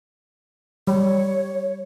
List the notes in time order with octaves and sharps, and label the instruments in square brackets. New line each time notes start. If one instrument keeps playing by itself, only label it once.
[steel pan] G3 [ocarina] C#5